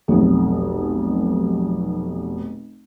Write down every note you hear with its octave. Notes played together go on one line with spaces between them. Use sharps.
F1 B1